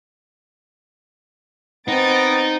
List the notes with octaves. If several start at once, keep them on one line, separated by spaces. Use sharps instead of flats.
B3 C4 D#4 A6 D7